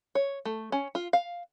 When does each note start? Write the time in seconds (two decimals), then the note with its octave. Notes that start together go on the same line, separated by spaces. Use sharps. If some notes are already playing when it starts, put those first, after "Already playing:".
0.15 C#5
0.45 A3
0.72 C#4
0.95 F4
1.13 F5